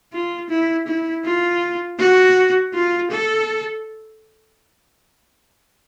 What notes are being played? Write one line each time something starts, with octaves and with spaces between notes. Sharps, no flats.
F4
E4
E4
F4
F#4
F4
A4